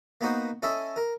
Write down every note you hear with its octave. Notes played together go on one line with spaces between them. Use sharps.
A#3 B3 D#4 F#4 C5
C#4 E4 A4 D#5
A#4